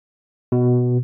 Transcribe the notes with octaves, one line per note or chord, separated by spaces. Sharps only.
B2